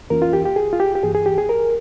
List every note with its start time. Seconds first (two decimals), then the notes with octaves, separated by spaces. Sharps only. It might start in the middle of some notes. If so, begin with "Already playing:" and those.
0.10 F2 E3 A#3 C#4 F4 A#4
0.22 F4
0.33 G4
0.45 G4
0.56 G#4
0.73 F4
0.80 G4
0.95 G4
1.03 G2 E3 A#3 G#4
1.15 G#4
1.26 G4
1.38 G#4
1.49 A#4